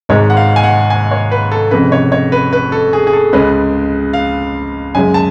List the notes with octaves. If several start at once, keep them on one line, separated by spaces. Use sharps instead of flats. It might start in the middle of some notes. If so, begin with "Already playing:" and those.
G#1 G#2 G#3 C#5
F#5
F5
G#5
F#5
G#5
C#5
B4
A4
F1 F2 C#3 B4
C#5
C#5
B4
B4
A4
G#4
G#4
A4
C#2 C#3 G#3 C#4 B4
F5
F#2 C#3 G#3 C#4 G#5
A5